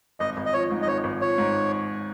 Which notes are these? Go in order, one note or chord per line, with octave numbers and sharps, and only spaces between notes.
G#1 D#5
G#1
D#5
F3 C#5
G#2
D#5
G#1 C#5
G#1
F3 C#5
G#2